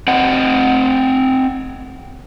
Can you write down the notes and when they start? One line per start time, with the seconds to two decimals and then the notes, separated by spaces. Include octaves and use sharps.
0.08 C4 D#5 F#5